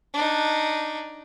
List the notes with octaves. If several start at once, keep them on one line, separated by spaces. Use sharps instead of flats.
D4 D#4